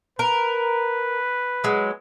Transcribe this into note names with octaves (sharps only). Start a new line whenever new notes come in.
A#4 B4
F#3 G#3